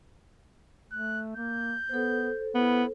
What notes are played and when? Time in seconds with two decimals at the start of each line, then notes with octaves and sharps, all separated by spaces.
0.92 A3 F#6
1.36 A#3 G6
1.89 B3 A4 C5
2.55 B3 E4